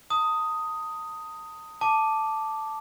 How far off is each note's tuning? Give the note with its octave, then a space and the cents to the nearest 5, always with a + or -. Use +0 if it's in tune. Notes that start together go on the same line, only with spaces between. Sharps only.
A5 +45 D#6 +5
A5 +0 D6 +0